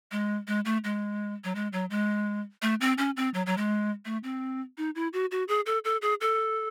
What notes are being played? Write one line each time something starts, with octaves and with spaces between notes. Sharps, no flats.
G#3
G#3
A3
G#3
F#3
G#3
F#3
G#3
A3
C4
C#4
C4
F#3
F#3
G#3
A3
C4
D#4
E4
F#4
F#4
G#4
A4
A4
G#4
A4